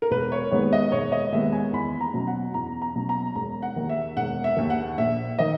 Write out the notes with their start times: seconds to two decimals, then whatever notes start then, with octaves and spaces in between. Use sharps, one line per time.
0.02 A#4
0.11 E1 B4
0.32 C#5
0.51 D#2 D#3 G#3 B3 C#5
0.73 D#5
0.92 E1 C#5
1.12 D#5
1.32 D#2 D#3 G#3 B3 E5
1.52 G#5
1.73 E2 B5
2.01 A#5
2.14 B2 F#3 C#4
2.27 F#5
2.54 E2 A#5
2.82 A#5
2.96 B2 F#3 C#4
3.09 A#5
3.36 E1 A#5
3.62 F#5
3.76 D#2 D#3
3.90 E5
4.17 E1 F#5
4.44 E5
4.57 D#2 D#3
4.70 F#5
4.98 A#1 E5
5.39 D#3 D#5